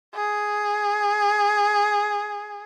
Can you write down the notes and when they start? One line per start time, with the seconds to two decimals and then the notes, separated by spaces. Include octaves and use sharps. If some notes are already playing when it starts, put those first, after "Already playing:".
0.15 G#4